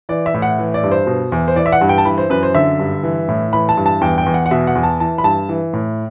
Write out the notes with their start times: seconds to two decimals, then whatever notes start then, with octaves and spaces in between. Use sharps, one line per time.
0.09 E3 D5
0.26 E5
0.34 A2
0.42 F#5
0.59 E3
0.74 D5
0.83 G2
0.91 C5
1.07 B2
1.32 E2
1.48 C5
1.56 E3 D5
1.66 E5
1.72 F#5
1.81 G2
1.89 G5
1.98 A5
2.05 E3 B5
2.18 C5
2.30 F#2 B4
2.43 C5
2.55 D3 E5
2.79 G2
3.03 E3
3.28 A2
3.53 E3 B5
3.69 A5
3.77 G2
3.86 A5
4.01 E2 G5
4.18 G5
4.26 E2
4.34 F#5
4.46 F#5
4.51 B2 E5
4.67 F#5
4.75 E2
4.83 A5
5.00 E3 A5
5.18 B5
5.24 G2 A5
5.49 E3
5.73 A2